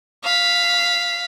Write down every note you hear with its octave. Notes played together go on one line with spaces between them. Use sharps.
F5 B6